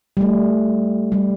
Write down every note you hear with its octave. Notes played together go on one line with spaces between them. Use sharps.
G3
A3
G3